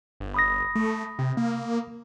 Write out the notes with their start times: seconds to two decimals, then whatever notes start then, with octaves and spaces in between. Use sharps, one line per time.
0.20 G1
0.34 B5 D#6 A#6
0.75 A3
1.19 C3
1.37 A#3